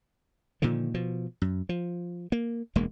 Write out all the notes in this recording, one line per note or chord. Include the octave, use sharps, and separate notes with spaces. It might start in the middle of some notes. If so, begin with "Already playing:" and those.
A#2 D3 D#3 F3
B2 F3
F#2
F3
A#3
E1 D2 G#3 A#3